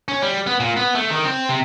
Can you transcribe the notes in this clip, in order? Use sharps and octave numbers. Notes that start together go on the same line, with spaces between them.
C#4
G3
B3
A#2
B3
A3
D#3
C4
C3